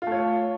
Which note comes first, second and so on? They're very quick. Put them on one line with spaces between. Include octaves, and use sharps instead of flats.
F4 A3 C#5